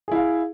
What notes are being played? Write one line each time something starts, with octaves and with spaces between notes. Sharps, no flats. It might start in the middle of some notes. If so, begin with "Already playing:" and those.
E4 G#4 F5